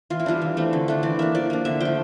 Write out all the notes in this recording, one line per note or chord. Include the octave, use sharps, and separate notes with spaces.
E3 F4
E4
G3 D4 F4
E3
A3 C4
D3
A3 D4
E3 D5
A#3 D4 E5
F3 D5
A#3 D4
D3 E5
F3 A3 G5